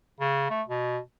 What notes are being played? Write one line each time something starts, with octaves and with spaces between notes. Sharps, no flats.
C#3
A3
B2